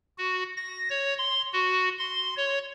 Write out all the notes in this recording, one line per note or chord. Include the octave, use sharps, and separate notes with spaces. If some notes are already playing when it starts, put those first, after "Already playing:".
F#4
A#6
C#5
C6
F#4
C6
C#5